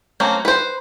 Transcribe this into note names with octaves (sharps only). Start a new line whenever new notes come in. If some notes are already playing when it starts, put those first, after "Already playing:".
F#3 A3 A#3 C4 C#4
B4 C5